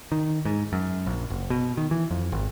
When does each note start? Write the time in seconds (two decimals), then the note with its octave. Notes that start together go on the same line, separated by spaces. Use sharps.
0.12 D#3
0.45 G#2
0.73 F#2
1.06 A#1
1.30 F#1
1.50 B2
1.77 D#3
1.91 E3
2.11 F2
2.32 G#1